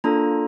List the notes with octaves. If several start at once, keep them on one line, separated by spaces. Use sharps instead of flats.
A#3 D4 F4 A4 A#5